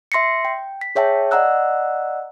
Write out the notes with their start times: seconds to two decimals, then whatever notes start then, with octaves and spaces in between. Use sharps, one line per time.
0.12 E5 C6 A#6 C7 C#7
0.45 G5
0.81 B6
0.95 G#4 C#5 E5 G5 A5
1.31 D5 D#5 F#5 A#5 E6 F#6